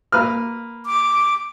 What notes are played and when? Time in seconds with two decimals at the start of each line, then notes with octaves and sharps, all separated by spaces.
0.12 A#3 B4 F6
0.86 D6